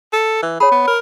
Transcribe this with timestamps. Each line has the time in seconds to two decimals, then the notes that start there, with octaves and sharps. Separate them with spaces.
0.13 A4
0.43 E3
0.60 G#4 C#5 B5
0.72 B3
0.88 A#4